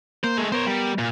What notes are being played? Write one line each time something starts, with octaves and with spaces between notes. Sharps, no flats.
A#3 C5
G#3 A3
B3 A#4 C5 C#5
G3
A#2